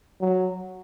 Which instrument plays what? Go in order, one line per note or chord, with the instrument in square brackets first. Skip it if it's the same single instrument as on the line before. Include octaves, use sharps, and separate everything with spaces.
[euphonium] F#3